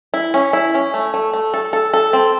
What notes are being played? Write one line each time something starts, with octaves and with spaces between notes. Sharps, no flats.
E4
C#4
E4
C#4
A3
A3
A3
A4
A4
A4
C4